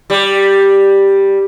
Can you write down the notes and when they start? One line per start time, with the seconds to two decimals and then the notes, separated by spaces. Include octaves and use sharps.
0.10 G3